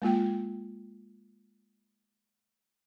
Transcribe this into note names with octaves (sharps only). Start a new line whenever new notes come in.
G#3 A#3 F4 G5